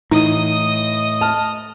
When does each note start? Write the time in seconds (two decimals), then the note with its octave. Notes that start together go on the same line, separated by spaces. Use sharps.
0.11 A2 E3 D#4 D#5 D#6
1.21 A5 F6